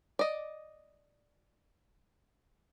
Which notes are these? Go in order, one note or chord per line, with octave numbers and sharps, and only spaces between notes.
D5 D#5